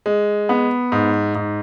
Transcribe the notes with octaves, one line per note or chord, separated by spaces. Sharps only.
G#3
B3
G#2
G#2